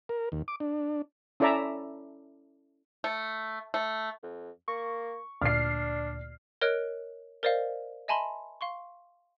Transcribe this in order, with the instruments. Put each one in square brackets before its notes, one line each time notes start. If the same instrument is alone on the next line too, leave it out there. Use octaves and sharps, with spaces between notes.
[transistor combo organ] A#4
D#2
D6
D4
[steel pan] C#4 E4 A4 D5 E5 A#5
[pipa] A3
A3
[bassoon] F2
[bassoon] A#3 [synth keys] C#6
[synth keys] D2 A#2 D5 [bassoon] D4 [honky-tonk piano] F6 C7
[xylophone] A#4 C#5 D#5 F6 F#6 D7
A#4 C5 D5 D#5 F5
D#5 E5 G#5 A5 B5 C6
F5 C6 C#6